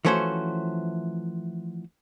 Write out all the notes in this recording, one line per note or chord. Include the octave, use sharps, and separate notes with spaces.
E3 F3 A3 C#4 F#4 C5